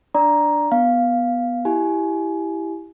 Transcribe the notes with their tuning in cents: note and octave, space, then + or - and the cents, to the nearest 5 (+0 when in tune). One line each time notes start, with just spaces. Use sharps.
D4 +0 D5 +0 A#5 +10
B3 +0 F5 +0
E4 +0 G4 +0 G#5 +25